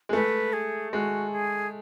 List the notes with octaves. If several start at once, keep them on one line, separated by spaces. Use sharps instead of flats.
G#3
A3 B4
G#4
G#3 F#4
G#4